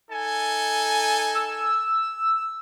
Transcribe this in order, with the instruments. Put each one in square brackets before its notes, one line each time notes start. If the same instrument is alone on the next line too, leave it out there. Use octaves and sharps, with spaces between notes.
[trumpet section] D#4 A4 G#5
[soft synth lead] E6